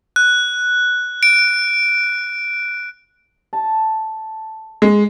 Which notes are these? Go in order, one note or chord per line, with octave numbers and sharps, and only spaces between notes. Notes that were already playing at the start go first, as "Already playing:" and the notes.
F#6
D7
A5
G#3